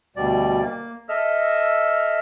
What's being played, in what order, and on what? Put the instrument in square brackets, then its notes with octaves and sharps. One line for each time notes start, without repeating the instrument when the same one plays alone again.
[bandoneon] D2 B2 G3 D5
A#3
A4 D#5 E5 E6 F6